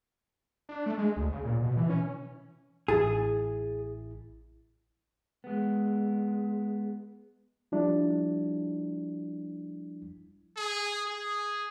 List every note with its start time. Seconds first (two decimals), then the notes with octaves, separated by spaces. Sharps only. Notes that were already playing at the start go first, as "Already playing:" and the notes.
0.69 D4
0.86 A3
0.98 G#3
1.16 D2
1.33 C#3
1.45 A#2
1.62 B2
1.77 E3
1.90 C#4
2.88 A1 E4 G#4 A6
5.44 G#3 B3
7.72 F3 G3 D4 E4
10.57 G#4
11.06 G#4